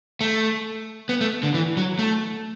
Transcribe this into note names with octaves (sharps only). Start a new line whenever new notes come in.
A3
B3
A3
D3
E3
F#3
A3